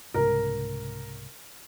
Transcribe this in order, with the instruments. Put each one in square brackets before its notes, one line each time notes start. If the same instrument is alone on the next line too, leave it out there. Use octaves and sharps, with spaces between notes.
[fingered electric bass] C2 G#2 C#3 [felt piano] A#4